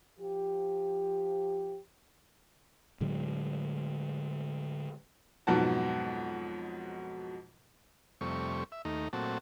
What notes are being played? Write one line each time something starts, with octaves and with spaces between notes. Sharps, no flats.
F3 G4
A2 D3 F#3 G#3
F2 G#2 B2 F#3 F#4 A5
F2 C3 G3 A3 C#6
E5
D#2 A3 D#4 A#5
A#2 F#3 A3 C4 F#4 A5